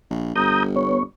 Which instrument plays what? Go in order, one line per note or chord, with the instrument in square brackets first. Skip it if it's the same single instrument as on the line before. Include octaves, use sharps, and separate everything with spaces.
[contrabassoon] A#1
[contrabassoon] G1 [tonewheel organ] A#5 D#6 G6
[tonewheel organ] B3 C#5